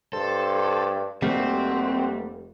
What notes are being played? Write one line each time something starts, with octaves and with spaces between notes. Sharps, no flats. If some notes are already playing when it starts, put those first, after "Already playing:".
G2 A4 C5
F1 G3 A3 A#3 C4 F#4